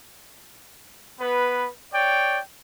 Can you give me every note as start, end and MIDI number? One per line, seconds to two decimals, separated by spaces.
1.20 1.68 59
1.20 1.68 71
1.93 2.39 73
1.93 2.39 74
1.93 2.39 79